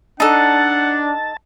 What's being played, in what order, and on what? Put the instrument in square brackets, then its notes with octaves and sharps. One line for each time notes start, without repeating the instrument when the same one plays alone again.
[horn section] D4 [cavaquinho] D#4 A4 [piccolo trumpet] F#5 [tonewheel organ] A5